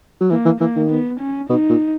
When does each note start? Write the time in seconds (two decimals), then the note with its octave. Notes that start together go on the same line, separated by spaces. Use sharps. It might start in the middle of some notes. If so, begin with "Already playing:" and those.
0.21 F#3
0.30 E3 A#3
0.45 E3
0.60 E3 A#3
0.76 D#3
0.90 B3
1.20 C#4
1.49 B2 D#4
1.70 A#2